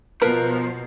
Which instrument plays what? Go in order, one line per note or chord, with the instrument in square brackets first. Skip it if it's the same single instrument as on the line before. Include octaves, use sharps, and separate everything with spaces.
[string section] B2 [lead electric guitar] F3 [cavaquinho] A#4 [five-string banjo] B4